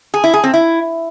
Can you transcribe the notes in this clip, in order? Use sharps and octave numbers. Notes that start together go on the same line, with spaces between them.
G#4
E4
G#4
C4
E4